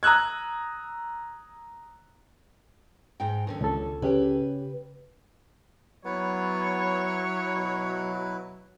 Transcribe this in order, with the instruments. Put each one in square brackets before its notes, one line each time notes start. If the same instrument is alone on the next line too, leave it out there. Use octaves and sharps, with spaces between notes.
[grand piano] A#5 D#6 E6 F#6 G#6
[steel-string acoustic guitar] G#2 D#4 G5
D#2 D3 C#4
[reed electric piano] C#2 A4
[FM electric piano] C#3 C#4 G4 [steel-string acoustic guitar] B4 G5
[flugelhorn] F#3 [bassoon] B3 [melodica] E4 B4 [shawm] C#5
[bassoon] B2